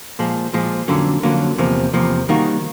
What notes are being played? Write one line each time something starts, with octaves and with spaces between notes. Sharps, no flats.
A#2 F3 G#3
A#2 F3 G#3
F2 D3 F#3 A#3 C#4
F2 D3 F#3 A#3 C#4
E2 C3 F3 A#3
E2 C3 F3 A#3
D#3 G3 A#3 D#4 F#4